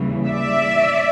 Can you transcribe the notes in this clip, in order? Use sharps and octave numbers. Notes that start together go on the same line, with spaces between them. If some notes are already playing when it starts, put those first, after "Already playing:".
Already playing: D#2 C#3 E3 G3
D5 E5